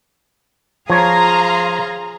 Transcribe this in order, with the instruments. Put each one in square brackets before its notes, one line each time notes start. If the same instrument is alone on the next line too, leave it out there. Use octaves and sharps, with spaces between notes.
[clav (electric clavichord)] F3 C#5 [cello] G#4 [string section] F5 A#5 C6